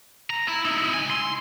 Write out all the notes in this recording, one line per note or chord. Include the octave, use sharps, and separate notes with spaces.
A#5
E4
D#4 E4
C#2 G#5
C6